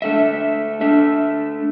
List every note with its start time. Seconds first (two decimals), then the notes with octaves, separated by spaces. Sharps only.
0.02 A3 D4 A4 E5
0.81 A3 D4 A4 E5